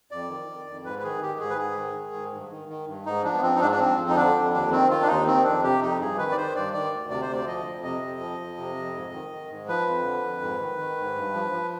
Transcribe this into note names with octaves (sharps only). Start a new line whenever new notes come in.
F2 D5
D#3
D#3
F2
G#2 B4
B4
D#3 G#4
D#3 G4
G#2 G#4
B4
G#2 G#4
D#3
D#3
G#2
G2
D#3
D#3
G2
G#2 D#4
F3 D4
B3
F3 C4
D#4
G#2 D4
D4
F3 C4
F2
D#4
D3 D4
F2
D#2 D4
D#3 C4
D#3 F4
D4
D#2 D#4
D#3 C4
F2 D4
C3 G4
F2 D#4
G2 G#4
D#3 B4
D5
D#3 C5
G2 D5
D#3 D5
D2
C3 D5
C5
D2 D5
F3 D#5
F2
C3 D#5
F2
F3
F2
C3
F2
G#2
D#3
D#3
G#2
F3 B4
F2
D3
F2
G#2
D#3
D#3
G#2
G2
F3
F3